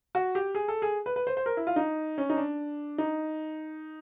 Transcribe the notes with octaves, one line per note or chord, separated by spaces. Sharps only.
F#4
G4
G#4
A4
G#4
B4
B4
C5
C5
A#4
E4
F4
D#4
C#4
D#4
D4
D#4